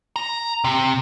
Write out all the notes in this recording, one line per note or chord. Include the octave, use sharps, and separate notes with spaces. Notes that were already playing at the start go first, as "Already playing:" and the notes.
A#5
C3